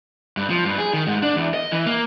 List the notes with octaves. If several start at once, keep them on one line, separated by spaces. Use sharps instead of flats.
G2
F3
G2
G#4
D#3
G#2
D4
E2
D#5
E3
A#3